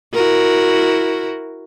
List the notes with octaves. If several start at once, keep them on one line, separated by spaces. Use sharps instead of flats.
E4 F#4 A#4